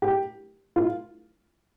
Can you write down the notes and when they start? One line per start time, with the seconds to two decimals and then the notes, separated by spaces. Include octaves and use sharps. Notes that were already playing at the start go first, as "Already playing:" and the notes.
0.02 G4
0.76 F4